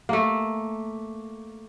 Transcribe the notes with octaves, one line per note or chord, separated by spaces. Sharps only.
A3 A#3